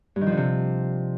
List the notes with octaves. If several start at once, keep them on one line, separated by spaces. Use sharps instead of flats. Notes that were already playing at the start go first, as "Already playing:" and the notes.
G2
D#3
F3
D3
C3